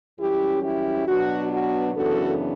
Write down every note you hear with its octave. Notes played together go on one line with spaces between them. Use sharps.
F#2 E3 G3 C#4 E4 G4
E4 G4
B2 F#3 B3 D4 F#4
F#4
F#2 C#3 E3 B3 D4 F#4 A4